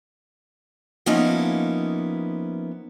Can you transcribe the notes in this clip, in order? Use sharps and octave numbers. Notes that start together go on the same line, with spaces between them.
F3 A#3 B3 C#4 D#4 E4